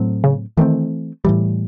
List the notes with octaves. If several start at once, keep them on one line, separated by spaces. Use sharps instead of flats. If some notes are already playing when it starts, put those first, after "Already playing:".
Already playing: A2 F#3 A3 C4
C#3
D#3 E3 A3 C4
A2 E3 G3